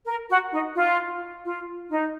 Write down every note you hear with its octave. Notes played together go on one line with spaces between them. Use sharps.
A#4
F#4
D#4
F4
F4
D#4